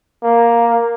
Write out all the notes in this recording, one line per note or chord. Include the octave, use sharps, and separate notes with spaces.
A#3